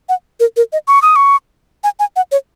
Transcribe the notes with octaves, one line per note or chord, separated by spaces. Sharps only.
F#5
A#4
A#4
D#5
C#6
D#6
C#6
G#5
G#5
F#5
C#5